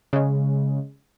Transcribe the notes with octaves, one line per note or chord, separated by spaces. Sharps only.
C#3 G#3